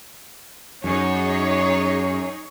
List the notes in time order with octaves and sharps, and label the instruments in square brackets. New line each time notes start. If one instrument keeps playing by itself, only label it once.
[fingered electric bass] F#2 [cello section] D#4 G#4 C#5